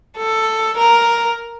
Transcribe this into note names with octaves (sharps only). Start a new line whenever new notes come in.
A4
A#4